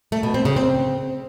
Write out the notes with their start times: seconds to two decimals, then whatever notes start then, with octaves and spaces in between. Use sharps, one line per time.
0.12 A3
0.23 B2
0.34 C4
0.45 C#3
0.56 C4